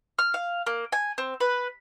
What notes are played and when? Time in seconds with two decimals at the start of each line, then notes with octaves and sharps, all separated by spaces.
0.19 F6
0.34 F5
0.66 A#3
0.92 G#5
1.18 C4
1.40 B4